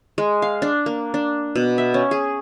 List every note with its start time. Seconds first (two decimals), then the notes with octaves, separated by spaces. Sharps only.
0.18 G#3
0.42 F5
0.62 D4
0.86 A#3
1.14 D4
1.55 B2
1.78 E5
1.94 C#4
2.11 G#4